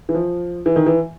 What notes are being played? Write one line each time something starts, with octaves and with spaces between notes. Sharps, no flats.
E3
F3
E3
D#3
E3